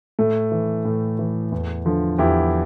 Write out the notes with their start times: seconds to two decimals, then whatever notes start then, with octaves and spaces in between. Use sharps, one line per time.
0.19 A2 A3
0.52 E3
0.85 A2
1.19 E3
1.52 E2
1.86 D3 F3
2.18 E2 E4 G4